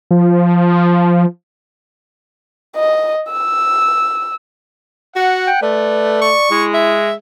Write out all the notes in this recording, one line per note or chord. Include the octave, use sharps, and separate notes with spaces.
F3
D#5
E6
F#4 F#5
G5
A3 B4 D5
C#6
G#3 E4
E5